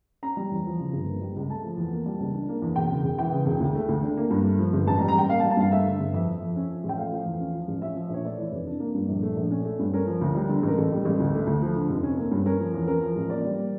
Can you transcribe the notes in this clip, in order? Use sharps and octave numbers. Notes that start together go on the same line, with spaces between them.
C#4 A#5
G3
E2
F3
C#3
G1
A#3
G3
C#2
A3 A5
F3
E2
A#3
G3
C#2
D4
A#3
E2
E1 G5
C#3
E1
E3 G5
C#3
E1
D2
A3
D2
D4
A#3
G2
A3
F3
G1
A1 A5
A#5
G3
A#5
A1 G5
A#3 F5
A5
G3
A5
G2 F5
A3 E5
D3
G1
F2 E5
F3
F2
C#4
F3
A1 G5
A3 F5
F3
E2
C#4
F3
A1
C#4 E5
F3
A#1 C#5
A3 D5
E3
F1
D4
A#3
G2
A#1
A3
A#1
C#4
A3
G2
C#4 A#4
F3
D2
G3
D3
A1 A#4
A1 A4
G3
A1
D2
A3
D2
F3
D3
F1
C#4
A#3
G2
C#4 A#4
F3
E2
C#4 A#4
F3
A1
A#3 D5
G3